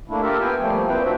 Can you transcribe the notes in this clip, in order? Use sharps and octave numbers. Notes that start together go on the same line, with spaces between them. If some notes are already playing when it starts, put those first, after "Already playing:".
A3 A#3 D4 E4
F4 G4 A4 A#4 E5
B3 G5 G#5
F3 G3 A3 A#3
A#2 C4 E4 B4 G5
A#3 D4 F#4 E5